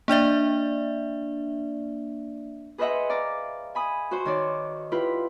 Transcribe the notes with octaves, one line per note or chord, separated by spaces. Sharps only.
A#3 D4 D5 E5
G#4 B4 C5 D#5 E5 F#5
D5 F5 A#5
G#5 B5 D#6
F#4 C5
D#3 C#5 D5
E4 F4 G4 B4